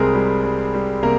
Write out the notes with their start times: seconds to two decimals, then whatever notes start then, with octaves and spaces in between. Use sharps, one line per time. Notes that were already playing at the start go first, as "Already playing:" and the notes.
Already playing: C2 C3 G3 G#3 C4 G#4 A#4
0.15 G3
0.45 G3
0.74 G3
1.03 C3 A#3 A#4